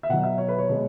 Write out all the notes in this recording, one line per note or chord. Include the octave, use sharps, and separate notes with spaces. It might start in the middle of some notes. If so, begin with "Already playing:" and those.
E5
B2 F#3 F#5
E5
C#5
B4
C#5
B2 G#3